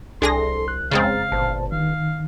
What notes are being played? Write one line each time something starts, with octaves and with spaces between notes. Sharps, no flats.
C2 D4 G#4 A4 C6 A#6
D2 F#6
F2 C#3 G#3 C4 F5 A#5 A6
G1 A#2 C5 A5
D#3 F5